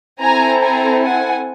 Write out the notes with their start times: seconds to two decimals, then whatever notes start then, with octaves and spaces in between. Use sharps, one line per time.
0.22 C4 E4 A4 G#5 A#5
0.62 G#5 A#5
1.03 F#5 G#5